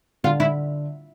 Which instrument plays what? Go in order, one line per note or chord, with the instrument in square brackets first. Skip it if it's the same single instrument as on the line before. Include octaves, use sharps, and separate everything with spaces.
[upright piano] D3 [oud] F4
[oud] E4